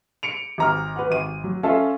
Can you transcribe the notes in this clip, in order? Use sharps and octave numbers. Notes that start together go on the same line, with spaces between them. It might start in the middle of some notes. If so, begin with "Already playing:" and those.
C#7 D7 F7
G#1 A#5 F6
B4 F#5
G#1 D#7
F#3
C#4 F4 A4 E5 F5